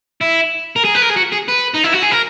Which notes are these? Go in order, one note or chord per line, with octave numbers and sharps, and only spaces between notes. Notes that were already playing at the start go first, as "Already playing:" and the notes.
E4
A#4
G#4
B4
A#4
G#4
F#4
G#4
B4
D#4
E4
F#4
G#4
A#4